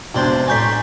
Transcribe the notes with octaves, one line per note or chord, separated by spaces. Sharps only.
F1 G#2 B2 D4 C5 D5 G5 G6
A2 C#5 D5 G#5 A#5 C6 G6 B6